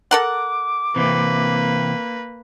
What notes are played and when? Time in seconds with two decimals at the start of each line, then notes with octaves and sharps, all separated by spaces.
0.11 A4 A#4 F#5 D6
0.96 C3 E3 A#3 C4 B4